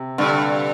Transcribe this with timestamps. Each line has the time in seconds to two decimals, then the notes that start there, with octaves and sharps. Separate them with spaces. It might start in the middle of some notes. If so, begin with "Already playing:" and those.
Already playing: C3
0.18 G2 D3